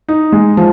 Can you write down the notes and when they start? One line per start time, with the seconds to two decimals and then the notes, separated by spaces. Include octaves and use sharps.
0.08 D#4
0.32 G#3
0.57 F3